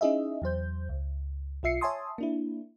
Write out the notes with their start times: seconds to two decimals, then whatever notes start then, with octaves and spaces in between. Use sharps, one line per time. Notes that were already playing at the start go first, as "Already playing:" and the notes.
0.01 C#4 D#4 E4 G#4 D#5 E5
0.42 E2 F#3 C5 G6
0.89 C#2
1.63 B1 F4 E5 C7 C#7
1.81 C#5 E5 G#5 A5 C6 D#6
2.18 A#3 D4 E4